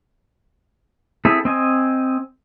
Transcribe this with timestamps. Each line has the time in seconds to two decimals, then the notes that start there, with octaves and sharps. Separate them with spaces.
1.25 C4 E4 G#4 A4
1.45 C4 D#5 G#5